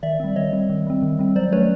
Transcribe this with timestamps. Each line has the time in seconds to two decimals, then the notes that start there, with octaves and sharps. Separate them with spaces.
0.03 D#3 D5 E5
0.20 G3 C4
0.36 D#3 C#5 D#5
0.53 G3 C4
0.69 D#3
0.87 G3 C4
1.02 D#3
1.19 G3 C4
1.36 F#3 C5 D5
1.52 A3 C#4 B4 C#5